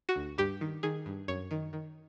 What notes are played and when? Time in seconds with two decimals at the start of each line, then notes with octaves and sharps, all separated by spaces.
0.09 F#4
0.16 D2
0.38 G2 G4
0.61 D#3
0.83 D#3 G#4
1.06 G2
1.28 F#2 C#5
1.51 D#3
1.73 D#3